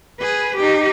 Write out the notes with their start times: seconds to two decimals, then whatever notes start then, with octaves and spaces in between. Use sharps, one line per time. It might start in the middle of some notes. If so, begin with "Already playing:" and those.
0.20 G#4 B4
0.56 D#4 G4